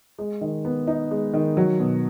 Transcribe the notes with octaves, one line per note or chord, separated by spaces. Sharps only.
G#3
D#3
B3
D#4
G#3
D#3
F#3
B2